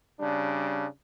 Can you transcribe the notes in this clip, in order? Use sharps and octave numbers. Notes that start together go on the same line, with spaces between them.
C#3 G3 D4